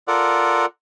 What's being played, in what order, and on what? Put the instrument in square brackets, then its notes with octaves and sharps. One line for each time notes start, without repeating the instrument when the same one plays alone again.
[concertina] F4 A4 A#4 D5 F#5